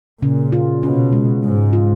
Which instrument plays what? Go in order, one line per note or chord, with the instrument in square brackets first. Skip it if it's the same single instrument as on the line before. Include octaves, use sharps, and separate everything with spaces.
[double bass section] A#2 [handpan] C#3
[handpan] F4
[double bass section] B2 [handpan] C#4
[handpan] G#3
[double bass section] G#2 [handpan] C#3
[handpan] F4